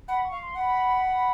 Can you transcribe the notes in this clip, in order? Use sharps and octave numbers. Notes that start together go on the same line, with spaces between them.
F#5 B5
C#6
F5
C6
F#5
B5